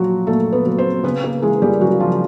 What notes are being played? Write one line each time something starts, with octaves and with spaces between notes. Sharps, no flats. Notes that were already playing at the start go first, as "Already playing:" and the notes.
Already playing: A#2 F3 F#3 F#4
A#2 A3 A4
B3 B4
F#3
C4 C5
C#3 B3 B4
A#3 A#4
E3 G#3 G#4
G3 G4
C#3 F#3 F#4
F3 F4